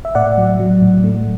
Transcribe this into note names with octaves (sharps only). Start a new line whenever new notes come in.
E5
A2 D5 F#5
F#3
F#3
A2
A3